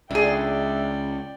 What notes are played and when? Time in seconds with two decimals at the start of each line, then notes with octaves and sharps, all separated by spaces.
0.11 C#2 D4 G#4 D5 E5 G5